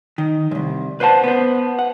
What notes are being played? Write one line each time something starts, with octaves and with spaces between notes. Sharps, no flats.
D#3
C2 F#2
B4 C5 D5 F#5 A5
B3 C5
F#5